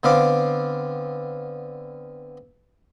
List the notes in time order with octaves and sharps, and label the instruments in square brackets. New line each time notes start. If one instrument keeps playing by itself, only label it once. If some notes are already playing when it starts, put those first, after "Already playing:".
[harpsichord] D3 B3 C4 F5 D6